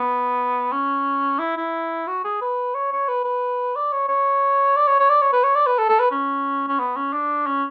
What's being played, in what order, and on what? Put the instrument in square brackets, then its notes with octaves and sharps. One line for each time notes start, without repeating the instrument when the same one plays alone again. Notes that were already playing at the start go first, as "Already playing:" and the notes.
Already playing: [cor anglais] B3
C#4
E4
E4
F#4
G#4
B4
C#5
C#5
B4
B4
D5
C#5
C#5
D5
C#5
C#5
D5
C#5
B4
C#5
D5
B4
A4
A4
B4
C#4
C#4
B3
C#4
D4
C#4